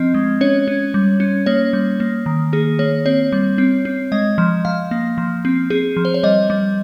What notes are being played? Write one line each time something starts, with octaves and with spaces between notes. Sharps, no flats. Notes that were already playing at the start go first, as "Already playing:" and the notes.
Already playing: F3 C4 D#5
G#3
C#4 C#5
C#4
G3
C#4
A#3 C#5
G3
A#3
D#3
A#3 G#4
A#3 C#5
C4 C#5
G3
C4
C4
G#3 D#5
F3
F3 F5
A#3
F3
C4
C4 G#4
F3
C5
C#5
G3 D#5
G3